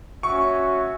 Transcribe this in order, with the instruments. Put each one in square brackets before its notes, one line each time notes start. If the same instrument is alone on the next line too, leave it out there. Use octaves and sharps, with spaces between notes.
[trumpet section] C#4 F#4 E5 [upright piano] C#6